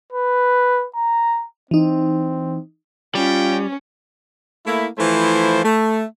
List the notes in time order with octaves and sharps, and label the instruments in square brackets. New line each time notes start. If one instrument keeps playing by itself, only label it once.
[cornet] B4
A#5
[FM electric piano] E3 D#4 [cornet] C4
[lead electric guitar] G3 [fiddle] C#4 [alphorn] F4 [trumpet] G5
[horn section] A3 A#3 E4
E3 F3 A3 E4 C5
A3